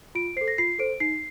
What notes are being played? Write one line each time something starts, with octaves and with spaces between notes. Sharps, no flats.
F4 D7
A4 C5 C7
A#6
F4 C7
A4 C5 D7
D#4 C7